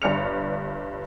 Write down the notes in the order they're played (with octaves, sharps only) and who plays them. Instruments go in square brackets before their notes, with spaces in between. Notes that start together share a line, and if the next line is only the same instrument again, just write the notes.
[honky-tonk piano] G1 G2 D5 F6 C#7 F7